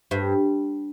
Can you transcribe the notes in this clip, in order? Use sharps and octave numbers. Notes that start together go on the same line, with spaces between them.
G2